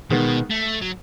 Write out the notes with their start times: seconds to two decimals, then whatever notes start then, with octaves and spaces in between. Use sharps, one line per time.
0.10 B2 D#3 G#3 B3
0.51 A3
0.82 F#3